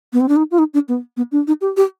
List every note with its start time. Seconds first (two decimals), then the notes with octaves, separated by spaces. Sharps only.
0.13 B3
0.21 C4
0.29 D4
0.36 D#4
0.51 F4
0.59 D#4
0.74 D4
0.88 B3
1.17 B3
1.32 D4
1.47 D#4
1.61 G4
1.77 G4